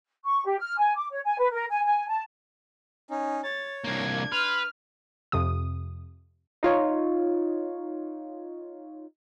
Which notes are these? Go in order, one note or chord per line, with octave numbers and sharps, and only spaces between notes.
C#6
G4
F6
G#5
D6
C#5
G#5
B4
A#4
G#5
G#5
A5
C#4 D#4
C#5 A6
C2 A#3 D4 G#6
B4 C6 F6
F2 C3 D#6
D#4 F4 C#5